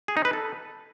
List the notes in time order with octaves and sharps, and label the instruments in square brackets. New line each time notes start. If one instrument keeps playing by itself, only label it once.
[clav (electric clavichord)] G#4
D#4
B4
A4